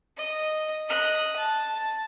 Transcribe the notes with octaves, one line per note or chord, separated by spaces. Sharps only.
D#5
D#5 F#6
A5